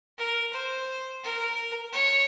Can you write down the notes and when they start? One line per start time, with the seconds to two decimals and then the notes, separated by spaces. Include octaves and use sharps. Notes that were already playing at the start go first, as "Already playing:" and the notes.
0.18 A#4
0.53 C5
1.24 A#4
1.93 C#5